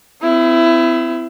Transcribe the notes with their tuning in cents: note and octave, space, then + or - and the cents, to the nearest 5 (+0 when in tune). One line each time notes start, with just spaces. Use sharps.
C4 -30 E4 +20